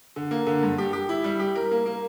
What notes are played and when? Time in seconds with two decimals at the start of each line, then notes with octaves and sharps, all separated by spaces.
0.16 D3
0.31 A#3
0.47 D3
0.63 G2
0.78 G4
0.93 G4
1.09 E4
1.24 G3
1.39 G4
1.56 A#4
1.71 A#3
1.86 A#3